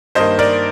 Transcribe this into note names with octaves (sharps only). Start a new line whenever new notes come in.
G2 D#3 A#3 C5 D#5
A#4 D5